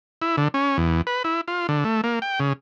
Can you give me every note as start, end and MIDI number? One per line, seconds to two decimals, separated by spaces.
0.22 0.36 64
0.37 0.48 50
0.54 0.77 61
0.78 1.02 40
1.07 1.23 71
1.24 1.41 64
1.48 1.67 65
1.69 1.84 50
1.84 2.01 57
2.04 2.19 58
2.22 2.39 79
2.40 2.53 49